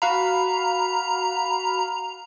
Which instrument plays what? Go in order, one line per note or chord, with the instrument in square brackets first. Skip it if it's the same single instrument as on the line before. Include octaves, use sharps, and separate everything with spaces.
[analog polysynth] F#4 F5 B5 [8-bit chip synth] A#5